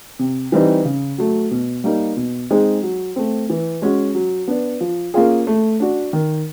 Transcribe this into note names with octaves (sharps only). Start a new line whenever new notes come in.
C3
E3 G3 C4 D#4
C#3
F#3 A3
B2
G3 A#3 D#4
B2
G#3 C4 D#4 G#4
F#3
A3 C4
E3
G#3 C#4 F#4
F#3
B3 D4
F3
A#3 C#4 F4 G#4
A3
D4 F#4
D#3